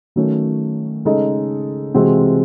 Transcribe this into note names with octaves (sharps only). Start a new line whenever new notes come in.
D#3 F#3 A3 C#4
C#3 G#3 D#4 A4 D#5
C3 E3 G#3 C4 F#4